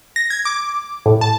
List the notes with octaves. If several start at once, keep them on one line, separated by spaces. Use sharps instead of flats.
A#6
G#6
D6
A2
A5